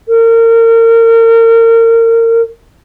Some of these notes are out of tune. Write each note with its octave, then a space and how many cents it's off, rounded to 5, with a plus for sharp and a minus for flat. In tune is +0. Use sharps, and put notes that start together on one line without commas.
A#4 -30